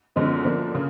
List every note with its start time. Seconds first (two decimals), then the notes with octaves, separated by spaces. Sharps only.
0.16 F#2 D3 F3 G#3 B3
0.44 D3 F3 A#3 D4
0.75 C#3